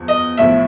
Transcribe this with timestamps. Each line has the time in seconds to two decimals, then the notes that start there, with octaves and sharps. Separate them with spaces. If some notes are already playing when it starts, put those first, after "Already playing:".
Already playing: E2 F3
0.08 D#5
0.38 B1 A2 F3 E5